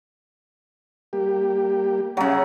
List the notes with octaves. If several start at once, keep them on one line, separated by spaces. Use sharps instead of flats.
G3 A#3 G4
C#3 F#3 C#5 E5